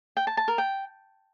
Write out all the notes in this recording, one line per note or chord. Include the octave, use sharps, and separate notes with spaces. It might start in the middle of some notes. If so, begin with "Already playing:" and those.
G5
A5
A5
A#4
G5